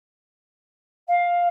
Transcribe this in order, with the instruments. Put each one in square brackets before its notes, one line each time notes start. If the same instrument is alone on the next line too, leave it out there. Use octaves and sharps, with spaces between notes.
[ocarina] F5